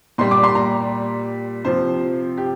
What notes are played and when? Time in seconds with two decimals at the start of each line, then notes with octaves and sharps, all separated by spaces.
0.18 A#2 G3 C6
0.31 D6
0.43 C6
0.55 A#5
1.65 C3 F3 C5
2.37 G4